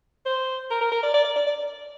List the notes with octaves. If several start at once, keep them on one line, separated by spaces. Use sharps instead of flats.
C5
A#4
A#4
A#4
D5
D5
D5
D5
D5